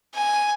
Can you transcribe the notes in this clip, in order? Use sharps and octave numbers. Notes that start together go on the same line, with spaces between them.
G#5